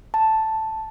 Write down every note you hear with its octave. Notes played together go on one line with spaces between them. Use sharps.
A5